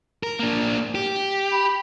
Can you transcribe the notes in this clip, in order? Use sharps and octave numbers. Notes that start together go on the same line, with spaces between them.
A#4
A#3 D4
G4
B5